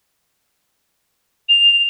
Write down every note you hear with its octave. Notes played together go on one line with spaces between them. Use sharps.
F7